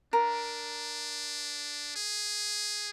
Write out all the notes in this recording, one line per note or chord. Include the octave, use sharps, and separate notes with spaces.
D4 A#4
G#4